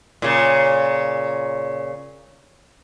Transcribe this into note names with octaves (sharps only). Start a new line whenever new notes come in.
A#2 C#3